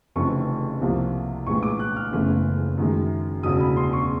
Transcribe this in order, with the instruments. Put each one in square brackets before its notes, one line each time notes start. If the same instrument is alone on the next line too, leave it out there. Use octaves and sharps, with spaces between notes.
[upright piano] F1 F2 C#3 E3 A3 C#6
C2 C3 F3 A#3
A#1 A2 E3 G#3 C#6
D6
F#6
F6
F#1 E2 C#3 E3 A3
F#2 D#3 G#3
E1 D2 C#3 F#3 D#6
B5
C6
C#6